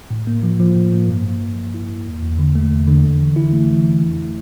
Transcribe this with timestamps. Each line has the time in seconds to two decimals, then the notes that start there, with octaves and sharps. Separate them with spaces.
0.11 A2
0.27 A#3
0.43 F3
0.60 F3
0.75 A2
0.92 A#3
1.08 G2
1.25 A#3
1.41 A#3
1.58 A#3
1.74 E4
1.89 A#3
2.06 E2
2.22 E2
2.39 D3
2.55 A3
2.71 E2
2.87 D3
3.04 F2
3.20 E3
3.36 E4
3.53 A3
3.69 E3
3.86 F2
4.01 E4
4.18 A3